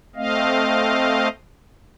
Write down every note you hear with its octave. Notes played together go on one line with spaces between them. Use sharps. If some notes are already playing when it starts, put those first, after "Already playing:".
A3 C4 D#5 F5